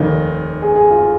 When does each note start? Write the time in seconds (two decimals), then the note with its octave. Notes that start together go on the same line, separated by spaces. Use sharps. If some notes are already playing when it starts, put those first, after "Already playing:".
Already playing: F1 D#2 D#3 D#4
0.62 G#4
0.76 G#4
0.91 F4